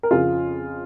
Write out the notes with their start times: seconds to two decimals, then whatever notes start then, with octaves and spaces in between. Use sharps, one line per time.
0.03 A#4
0.11 F2 C#3 F3 F4 G#4